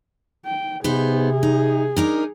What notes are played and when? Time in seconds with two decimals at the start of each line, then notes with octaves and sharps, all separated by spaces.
0.45 G5
0.84 C3 B3 D#4 G#4 C5
1.43 D#4
1.97 D4 D#4 A#4